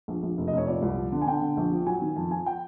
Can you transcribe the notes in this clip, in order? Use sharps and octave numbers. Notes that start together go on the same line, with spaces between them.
A#1
A#1
F1
D#5
F1 C#5
A#2 D5
C2
F3
D3
G#5
D3 G5
D3
A#1
F3
F#3 G#5
D#3
F2 A5
F3 G#5
G5